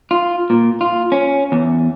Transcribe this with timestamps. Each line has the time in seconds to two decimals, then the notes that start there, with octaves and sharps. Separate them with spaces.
0.11 F4
0.50 A#2
0.81 F4
1.12 C#4
1.52 E2